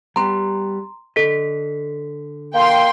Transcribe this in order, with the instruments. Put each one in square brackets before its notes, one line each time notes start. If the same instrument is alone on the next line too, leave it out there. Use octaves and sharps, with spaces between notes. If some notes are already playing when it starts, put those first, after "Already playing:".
[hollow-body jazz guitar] G3 B3 G4 [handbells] A#5 C6
[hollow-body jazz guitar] D3 D#5 [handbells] A4 B6
[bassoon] A#3 [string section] G5 C6